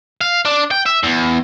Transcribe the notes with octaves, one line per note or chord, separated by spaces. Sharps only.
F5
D4
G5
E5
E2